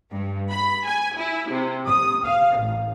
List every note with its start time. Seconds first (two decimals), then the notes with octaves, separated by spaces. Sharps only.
0.11 G2
0.51 B5
0.86 G#5
1.17 E4
1.50 C3
1.87 D#6
2.26 F5
2.59 A1